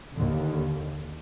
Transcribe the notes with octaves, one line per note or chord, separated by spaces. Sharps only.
D#2 D3